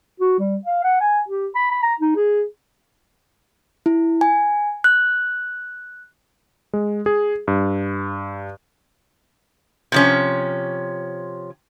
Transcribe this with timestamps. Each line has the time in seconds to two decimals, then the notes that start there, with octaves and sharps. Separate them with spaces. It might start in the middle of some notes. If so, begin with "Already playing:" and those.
0.20 F#4
0.39 G3
0.65 F5
0.84 F#5
1.00 G#5
1.28 G4
1.55 B5
1.71 B5
1.83 A#5
2.00 D#4
2.16 G#4
3.86 E4
4.21 G#5
4.84 F#6
6.73 G#3
7.06 G#4
7.48 G2
9.92 C3 F3 C#4